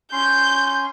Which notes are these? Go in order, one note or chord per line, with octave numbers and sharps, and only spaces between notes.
C#4 C6 G6